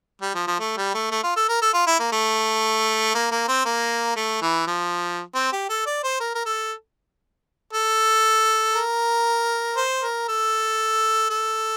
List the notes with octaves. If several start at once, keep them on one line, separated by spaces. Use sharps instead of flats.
G3
F3
F3
A3
G3
A3
A3
F4
A4
A#4
A4
F4
E4
A#3
A3
A#3
A#3
C4
A#3
A3
E3
F3
C4
G4
A4
D5
C5
A#4
A#4
A4
A4
A#4
C5
A#4
A4
A4